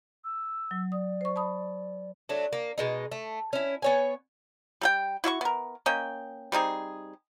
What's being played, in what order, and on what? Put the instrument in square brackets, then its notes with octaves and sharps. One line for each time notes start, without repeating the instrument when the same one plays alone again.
[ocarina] E6
[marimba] F#3
[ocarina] D5 [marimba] D#6
[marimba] C5 C#6
A5 B5 D#6
[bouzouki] F#3 A3 D4
A#3
B2 G#3 D#4
A3
C#4 E4
B3 C#5 G#5
[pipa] G3 A4 G5
E4 F#4 E5 C#6
B3 A#4
A#3 C#4 D#5 G5
G3 C4 D#4 G#4